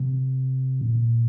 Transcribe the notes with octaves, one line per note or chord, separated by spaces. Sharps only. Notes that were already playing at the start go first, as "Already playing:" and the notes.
Already playing: C3
A#2